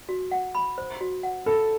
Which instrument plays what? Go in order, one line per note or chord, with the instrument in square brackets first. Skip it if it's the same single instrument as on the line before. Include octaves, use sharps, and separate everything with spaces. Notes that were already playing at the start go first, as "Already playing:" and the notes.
[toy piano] F#4
F#5
B5
C5
F#4
F#5
[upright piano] A4 [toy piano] B5